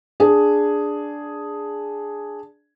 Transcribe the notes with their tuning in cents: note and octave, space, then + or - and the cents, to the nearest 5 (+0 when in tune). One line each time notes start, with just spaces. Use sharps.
D4 +0 G#4 +0